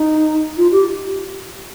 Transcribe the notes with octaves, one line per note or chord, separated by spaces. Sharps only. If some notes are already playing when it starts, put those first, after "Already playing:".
Already playing: D#4
F4
G4